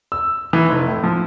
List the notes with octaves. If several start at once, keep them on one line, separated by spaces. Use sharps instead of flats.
E6
E3
F1
A2
F3